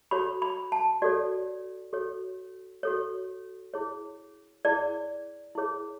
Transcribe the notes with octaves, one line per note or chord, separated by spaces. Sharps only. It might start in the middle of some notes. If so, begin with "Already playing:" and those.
F#4 A4 C#5 B5
B5
A5
F#4 A4 C#5 D5
F#4 A4 C#5
F#4 A4 C#5
E4 G#4 C#5
E4 G#4 C#5 D5
E4 G#4 C#5